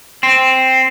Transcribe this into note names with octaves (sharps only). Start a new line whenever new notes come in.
C4